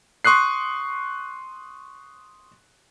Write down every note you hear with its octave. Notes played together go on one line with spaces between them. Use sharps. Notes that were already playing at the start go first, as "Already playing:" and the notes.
C6 C#6 D#6 F#6 C7